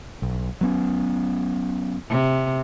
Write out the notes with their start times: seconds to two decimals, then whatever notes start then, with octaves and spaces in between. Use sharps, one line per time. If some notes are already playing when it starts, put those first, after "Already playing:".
0.22 B1
0.61 F#3 B3 C#4
2.10 C3